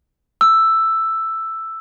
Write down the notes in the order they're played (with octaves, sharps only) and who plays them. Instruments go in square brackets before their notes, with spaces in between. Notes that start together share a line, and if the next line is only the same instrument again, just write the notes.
[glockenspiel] E6